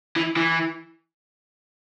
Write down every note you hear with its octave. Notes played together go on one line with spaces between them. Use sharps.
E3
E3